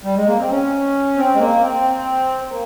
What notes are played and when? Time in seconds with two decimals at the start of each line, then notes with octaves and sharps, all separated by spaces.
0.04 G3
0.16 G#3
0.27 A#3
0.39 C4
0.50 C#4
1.16 C4
1.34 G#3
1.39 A#3
1.62 C4
2.45 C4
2.50 A#3